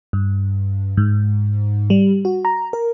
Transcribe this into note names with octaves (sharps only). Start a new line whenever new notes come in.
G2
G#2
G3
F#4
A#5
A#4